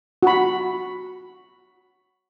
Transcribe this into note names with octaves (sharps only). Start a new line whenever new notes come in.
F#4 B5